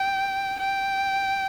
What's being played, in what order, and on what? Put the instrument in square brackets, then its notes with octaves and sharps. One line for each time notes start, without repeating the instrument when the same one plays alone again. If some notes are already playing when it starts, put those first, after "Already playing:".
Already playing: [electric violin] G5
G5